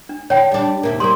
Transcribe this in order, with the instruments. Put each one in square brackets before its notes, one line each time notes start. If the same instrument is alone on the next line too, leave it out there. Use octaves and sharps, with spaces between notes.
[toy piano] D4
[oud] D3 [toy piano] C#5 G5 A5
[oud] G3 D4
D#2 C3 A#3
[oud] G3 A#3 [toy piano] C6 D#6